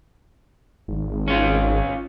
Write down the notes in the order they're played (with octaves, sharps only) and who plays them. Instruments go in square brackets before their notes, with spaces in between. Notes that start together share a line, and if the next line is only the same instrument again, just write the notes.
[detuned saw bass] G#1
[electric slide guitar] C#4 F4